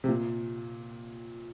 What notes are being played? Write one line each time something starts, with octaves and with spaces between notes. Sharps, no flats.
C3
A#2